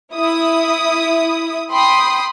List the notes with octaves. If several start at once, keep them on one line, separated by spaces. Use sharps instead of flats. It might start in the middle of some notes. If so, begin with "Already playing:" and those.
E4 D#6
G5 B5 C6 D#6